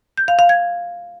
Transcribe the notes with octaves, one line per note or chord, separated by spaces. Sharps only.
G6
F5
F5
G#6